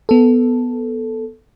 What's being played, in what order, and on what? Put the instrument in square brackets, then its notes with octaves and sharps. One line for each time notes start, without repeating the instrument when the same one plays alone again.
[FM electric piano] B3 A4